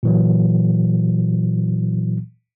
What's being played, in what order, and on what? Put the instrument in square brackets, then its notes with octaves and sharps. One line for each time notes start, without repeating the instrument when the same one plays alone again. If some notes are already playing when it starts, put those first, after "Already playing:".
[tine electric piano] A#2 E3 F#3